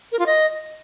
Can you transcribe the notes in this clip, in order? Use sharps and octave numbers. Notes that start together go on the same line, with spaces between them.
A#4
F4
D#5